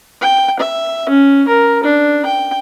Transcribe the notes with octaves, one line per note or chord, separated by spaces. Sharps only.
G5
E5
C#4
A#4
D4
G5